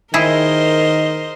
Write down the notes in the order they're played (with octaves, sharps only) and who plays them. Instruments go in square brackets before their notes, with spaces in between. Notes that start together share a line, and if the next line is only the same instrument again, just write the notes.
[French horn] D#3 [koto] E4 G#4 [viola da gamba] A#4 C5 D#5